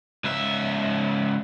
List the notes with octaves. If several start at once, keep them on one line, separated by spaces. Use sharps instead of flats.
C#2 E5